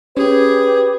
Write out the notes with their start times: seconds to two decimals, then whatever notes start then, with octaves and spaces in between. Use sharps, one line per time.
0.17 C#4 G4 G#4 B4